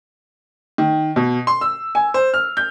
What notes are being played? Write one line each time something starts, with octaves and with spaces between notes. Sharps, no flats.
D#3
B2
C6
E6
G#5
C5
F6
G6